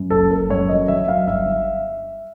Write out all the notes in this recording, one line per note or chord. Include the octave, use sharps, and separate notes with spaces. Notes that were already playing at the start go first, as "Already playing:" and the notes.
Already playing: F#2
F#1 A4
F#1 A#4
F#2 C#5
F#3 D#5
F#3 E5
F#3 F5
G1 E5